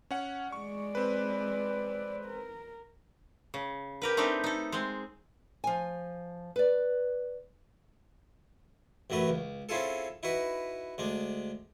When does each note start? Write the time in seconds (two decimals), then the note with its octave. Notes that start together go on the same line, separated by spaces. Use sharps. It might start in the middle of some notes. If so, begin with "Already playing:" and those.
0.11 C#4 F#5
0.52 G#3 D5 C#6
0.95 C4 B4
2.25 A#4
3.54 C#3
4.02 G4 A#4 B4
4.17 A3 C4 D4 D#4 G4 B4
4.44 D#4 A4
4.72 G#3 C4
5.64 F3 G#5
6.56 B4 D5
9.10 A1 F#2 F#3 A3 B4
9.29 C#2
9.69 C4 C#4 E4 F4 G#4 A4
10.23 D#4 E4 F#4 B4
10.98 D2 G#3 D4